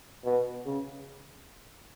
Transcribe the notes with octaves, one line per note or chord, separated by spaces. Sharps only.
B2
C#3